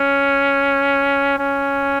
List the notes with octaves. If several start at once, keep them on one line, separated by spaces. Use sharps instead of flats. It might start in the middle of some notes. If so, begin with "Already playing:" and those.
Already playing: C#4
C#4